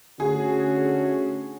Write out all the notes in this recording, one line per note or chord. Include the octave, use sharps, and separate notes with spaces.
D3 A3 C#4 F#4 G#4